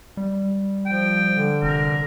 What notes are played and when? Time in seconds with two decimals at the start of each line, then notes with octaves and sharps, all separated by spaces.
0.17 G3
0.86 F3 G5
1.33 D3
1.62 F1 A#4